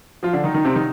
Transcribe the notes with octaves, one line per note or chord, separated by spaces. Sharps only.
F3 F4
D3 D4
D#3 D#4
D#3 D#4
C3 C4
D#3 D#4